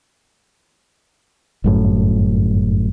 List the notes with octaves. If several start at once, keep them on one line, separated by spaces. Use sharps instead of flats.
G1 F#2 A2